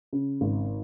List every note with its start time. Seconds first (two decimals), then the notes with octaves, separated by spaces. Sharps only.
0.13 C#3
0.41 G#1